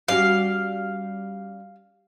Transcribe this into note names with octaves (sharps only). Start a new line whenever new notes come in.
G3 C#4 F#4 F5